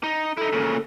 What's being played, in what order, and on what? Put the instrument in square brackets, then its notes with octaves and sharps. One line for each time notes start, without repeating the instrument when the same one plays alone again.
[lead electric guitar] D#4
[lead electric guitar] D#4 E4 [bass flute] A4
[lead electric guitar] A#2 C#3